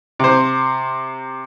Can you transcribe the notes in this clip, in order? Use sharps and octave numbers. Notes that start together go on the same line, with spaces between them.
C3 C5